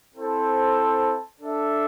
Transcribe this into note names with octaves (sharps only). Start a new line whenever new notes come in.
C4 E4 A4 C5
D4 A4 E5